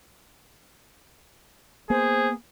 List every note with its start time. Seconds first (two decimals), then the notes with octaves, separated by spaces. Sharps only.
1.90 A#3 B3 G#4 C5